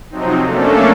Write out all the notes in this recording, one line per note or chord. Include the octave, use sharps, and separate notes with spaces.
C3 F3 F#3 C4 D#4
A3 A#3 C#4 D4 A4